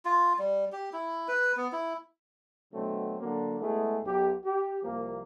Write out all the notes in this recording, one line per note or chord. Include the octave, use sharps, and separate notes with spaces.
F4
G3
G4
E4
B4
B3
E4
B2 D3 F#3 A3 C4
D3 F#3 A#3
G#3 A3 B3 E4 G#4
B1 G4
G4
C2 F3 A#3